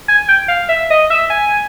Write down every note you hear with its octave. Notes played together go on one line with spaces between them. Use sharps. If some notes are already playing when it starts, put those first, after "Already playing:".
G#5
G5
F5
E5
D#5
E5
G#5